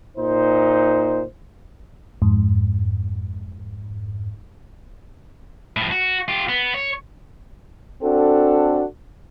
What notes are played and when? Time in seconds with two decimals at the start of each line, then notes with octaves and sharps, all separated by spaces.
0.17 A#2 D#4 C5
2.22 F2 G#2
5.77 A2 F3
5.91 F#4
6.28 F4 G4
6.49 B3
6.74 C#5
8.02 C4 D4 F#4 A4